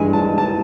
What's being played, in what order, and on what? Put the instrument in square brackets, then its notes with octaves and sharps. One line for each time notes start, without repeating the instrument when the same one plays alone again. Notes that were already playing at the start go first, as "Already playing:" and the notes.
Already playing: [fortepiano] G2 E3 G#3 G#5
A5
A5